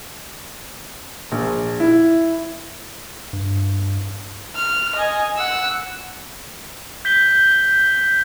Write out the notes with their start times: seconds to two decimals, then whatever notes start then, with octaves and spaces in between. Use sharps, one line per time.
1.32 A#1
1.80 E4
3.33 G2
4.56 F6
4.95 D#5 G#5
5.36 F#5 E6
7.05 G6 B6 G7